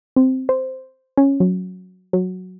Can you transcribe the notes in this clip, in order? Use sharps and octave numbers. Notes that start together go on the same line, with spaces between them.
C4
C5
C#4
F#3
F#3